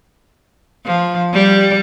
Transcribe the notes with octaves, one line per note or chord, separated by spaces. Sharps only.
F3
G3